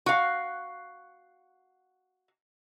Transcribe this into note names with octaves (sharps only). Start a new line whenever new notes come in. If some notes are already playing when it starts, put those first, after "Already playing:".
F#4 F5